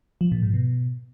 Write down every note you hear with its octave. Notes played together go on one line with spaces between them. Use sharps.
F3
A#2
G#2
B2